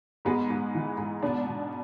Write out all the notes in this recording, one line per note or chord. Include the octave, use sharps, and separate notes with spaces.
G#2 G#3 B3
G#2
E3
G#2
B2 B3 D4
B2